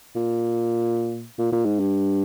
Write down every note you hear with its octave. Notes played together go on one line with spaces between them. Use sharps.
A#2
A#2
A#2
G#2
G2